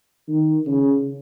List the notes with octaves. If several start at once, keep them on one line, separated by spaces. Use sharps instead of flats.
D#3
C#3